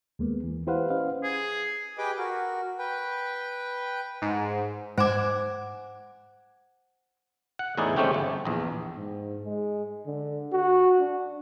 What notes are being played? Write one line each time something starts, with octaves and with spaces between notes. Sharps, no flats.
D#2 G#3 A#3 B3
E3
E4 G4 B4 C5 F5 F#5
C#4 B4 C5 D#5 F5
G#4
G4 G#4 B4 D#5 G5 D6
F#4 A#4
B4 G5
G#2
G#2 C5 F#5 G#5 D6 D7 E7
F#5
E2 A2 D#4 E4 G#4 D5
G#3 A3 C4 C#4 G4 G5
G1
A#1 E2
G#2
G#3
D3
F#4
D4